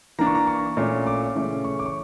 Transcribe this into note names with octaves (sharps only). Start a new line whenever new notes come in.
E3 A#3 D4 A#5
C#6
A#5
C#6
A#2 A3 C#4
D6
C#3 E3 A3 C#4
C#6
D6
C#6